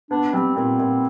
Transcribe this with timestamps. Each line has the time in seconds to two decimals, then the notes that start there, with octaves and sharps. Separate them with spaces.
0.10 B3 D4
0.33 G3 C4
0.56 A#2 C4
0.79 A#2